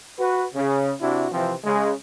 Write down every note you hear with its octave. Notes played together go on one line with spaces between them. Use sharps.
F#4 B4
C#3
C3 D4 E4 F#4
C3 E3 F3 C4
C#3 G#3